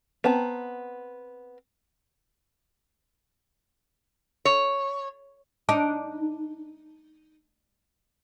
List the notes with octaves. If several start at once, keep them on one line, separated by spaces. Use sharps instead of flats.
B3 C4 A5 A#5
C#5
D4 D#4